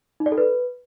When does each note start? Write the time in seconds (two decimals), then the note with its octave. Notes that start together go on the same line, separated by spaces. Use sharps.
0.20 D#4
0.26 D5
0.32 A4
0.38 B4